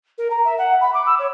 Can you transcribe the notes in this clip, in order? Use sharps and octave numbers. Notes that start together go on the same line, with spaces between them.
A#4
A#5
E5
F#5
B5
D6
E6
C#5